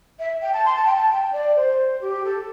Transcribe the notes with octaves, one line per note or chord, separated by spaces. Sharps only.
E5
G5
A5
C6
A5
G5
A5
G5
D5
C5
G4
A4